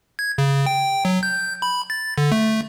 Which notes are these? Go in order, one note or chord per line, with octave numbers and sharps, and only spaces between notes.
G#6
C#3
G5
F#3
G6
B5
A6
D3
A3